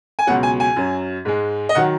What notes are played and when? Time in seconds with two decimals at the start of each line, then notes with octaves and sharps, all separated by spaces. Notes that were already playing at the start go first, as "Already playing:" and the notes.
0.19 G#5
0.27 C#2 B2 F#3 F#5
0.43 G#5
0.60 G#5
0.76 F#2 F#3
1.25 G#2 G#3
1.69 D#5
1.75 D#3 F#3 F#5